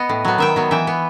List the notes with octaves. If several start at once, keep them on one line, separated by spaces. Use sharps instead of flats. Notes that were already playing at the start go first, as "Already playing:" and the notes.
Already playing: B3 D#5 F#5
A2
F#3 B3
D#3 E5 G5
F#3 B3
E3 E5 G5
B3